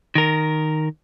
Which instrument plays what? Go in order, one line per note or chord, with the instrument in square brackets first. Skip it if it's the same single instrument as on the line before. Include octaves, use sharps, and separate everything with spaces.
[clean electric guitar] D#3 A#4